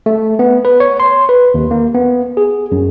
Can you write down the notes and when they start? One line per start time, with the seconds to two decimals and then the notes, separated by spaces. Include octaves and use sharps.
0.06 A3
0.39 B3
0.65 B4
0.80 C#5
1.00 C6
1.29 B4
1.54 D#2
1.71 A#3
1.95 B3
2.37 G#4
2.72 F#2